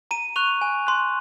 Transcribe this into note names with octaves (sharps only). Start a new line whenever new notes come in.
A#5 D#7
C#6 F#6 F7
G#5
C6 F#6